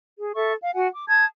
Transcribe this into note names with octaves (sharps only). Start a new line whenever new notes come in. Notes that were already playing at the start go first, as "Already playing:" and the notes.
G#4
A4 E5 C#6
F5
F#4 F#5 G#5
D6
A5 D#6 G#6